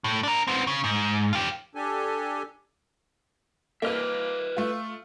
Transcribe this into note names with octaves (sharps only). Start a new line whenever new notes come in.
A2
D4 A#4
B3 C4
C#3
G#2
F4 G4
D4 G4 A4 G#5
A#3 B4 D#5 E5 F6
A3 F4